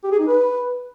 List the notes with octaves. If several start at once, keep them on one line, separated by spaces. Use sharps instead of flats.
G4
G#4
D#4
B4